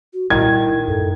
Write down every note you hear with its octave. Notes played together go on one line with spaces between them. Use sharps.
F#4
A#2 D#3 G3 E4 G#6
F#2 A2 A4